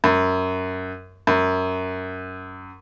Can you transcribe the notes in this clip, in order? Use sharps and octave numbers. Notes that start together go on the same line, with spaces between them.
F#2
F#2